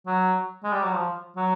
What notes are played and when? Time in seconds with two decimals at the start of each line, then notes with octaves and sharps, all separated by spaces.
0.06 F#3
0.64 G#3
0.73 G3
0.84 F#3
0.93 F3
1.36 F#3